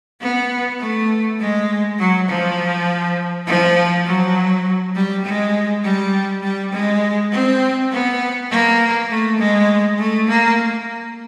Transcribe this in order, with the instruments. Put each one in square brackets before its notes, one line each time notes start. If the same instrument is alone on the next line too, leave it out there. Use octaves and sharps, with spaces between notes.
[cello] B3
A3
G#3
F#3
F3
F3
F#3
G3
G#3
G3
G3
G#3
C4
B3
A#3
A3
G#3
A3
A#3